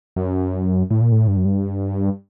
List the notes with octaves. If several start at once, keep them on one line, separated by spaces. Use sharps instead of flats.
F#2
A2
A#2
A2
G2
F#2
G2